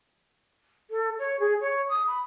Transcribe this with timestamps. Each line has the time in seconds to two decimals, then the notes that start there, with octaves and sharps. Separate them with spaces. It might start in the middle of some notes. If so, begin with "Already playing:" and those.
0.91 A4
1.19 C#5
1.40 G#4
1.61 C#5
1.89 D#6
2.07 B5